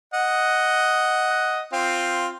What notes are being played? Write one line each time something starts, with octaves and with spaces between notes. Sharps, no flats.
D#5 F#5
C4 F4